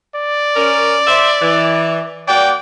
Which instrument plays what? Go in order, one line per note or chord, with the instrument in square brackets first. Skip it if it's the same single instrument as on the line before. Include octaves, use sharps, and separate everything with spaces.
[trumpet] D5
[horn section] C#4 A#4
C5 E5
E3
[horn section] A#3 F#4 D5 [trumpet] G5